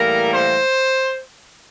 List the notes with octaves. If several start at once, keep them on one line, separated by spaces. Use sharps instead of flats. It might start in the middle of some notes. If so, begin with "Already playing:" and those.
Already playing: A2 E3 G3 A#3 A#4
C5